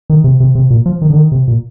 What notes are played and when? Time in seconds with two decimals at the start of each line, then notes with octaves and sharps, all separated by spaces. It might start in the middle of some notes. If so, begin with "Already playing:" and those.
0.10 D#3
0.24 C3
0.40 C3
0.55 C3
0.70 A#2
0.86 F3
1.02 D#3
1.10 D3
1.17 D#3
1.32 C3
1.48 A#2